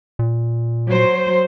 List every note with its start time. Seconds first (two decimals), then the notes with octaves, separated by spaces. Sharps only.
0.19 A#2
0.90 F#3 C5